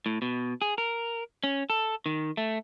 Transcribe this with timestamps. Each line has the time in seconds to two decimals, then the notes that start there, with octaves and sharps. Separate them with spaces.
0.06 A2
0.22 B2
0.62 G#4
0.78 A#4
1.44 C#4
1.70 A4
2.06 D#3
2.37 A3